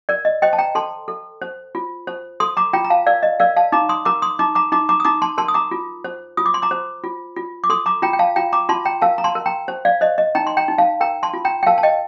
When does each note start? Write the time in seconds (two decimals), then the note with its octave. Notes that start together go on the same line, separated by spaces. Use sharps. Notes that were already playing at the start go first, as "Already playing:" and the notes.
0.09 A#4 D5
0.25 D#5
0.42 C5 D#5 G5
0.53 A5
0.58 G5 A#5
0.75 A4 A5 C6
1.08 A4
1.42 C5
1.75 F4
2.07 C5
2.40 A4 C6 D#6
2.57 A#5 D6
2.73 F4 G5 A#5
2.84 A#5
2.90 F5 A5
3.06 A#4 D5 F5
3.23 D#5
3.40 A#4 D5 F5
3.57 F5 A5
3.72 D#4 A#5 D6
3.89 C6 D#6
4.05 A#4 A#5 D6
4.22 C6 D#6
4.39 D#4 A#5 D6
4.55 A#5 D6
4.72 D#4 A#5 D6
4.89 A#5 D6
5.00 D#6
5.05 D#4 A#5 D6
5.22 A5 C6
5.38 A#4 A5 C6
5.48 D#6
5.54 A#5 D6
5.71 F4
6.04 C5
6.37 F4 D#6
6.46 D6
6.54 C6
6.62 A#5 D6
6.71 C5
7.04 F4
7.36 F4
7.64 D6
7.70 A4 C6 D#6
7.86 A#5 D6
8.02 F4 G5 A#5
8.13 G5
8.19 F5 A5
8.36 F4 G5 A#5
8.53 A#5 D6
8.69 F4 A5 C6
8.85 G5 A#5
9.02 A#4 F5 A5
9.18 A#5
9.24 A5 C6
9.35 A#4
9.46 G5 A#5
9.68 C5
9.85 D5 F5
10.01 C5 D#5
10.18 D#5
10.35 D#4 G5 A#5
10.47 C6
10.57 G5 A#5
10.68 D#4
10.78 F5 A5
11.01 A#4 G5 A#5
11.23 A5 C6
11.34 F4
11.45 G5 A#5
11.63 G5
11.66 A#4 F5 A5
11.78 A5
11.83 D#5 G5